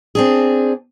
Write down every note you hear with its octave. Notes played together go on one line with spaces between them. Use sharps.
C4 D4 G#4